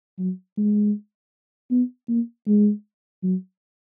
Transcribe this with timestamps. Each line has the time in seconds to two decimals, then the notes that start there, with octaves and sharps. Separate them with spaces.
0.19 F#3
0.57 G#3
1.71 B3
2.09 A#3
2.47 G#3
3.23 F#3